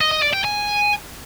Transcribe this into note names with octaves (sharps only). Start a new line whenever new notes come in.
D#5
D#5
D5
G5
G#5